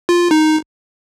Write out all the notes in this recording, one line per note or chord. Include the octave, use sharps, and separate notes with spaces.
F4
D#4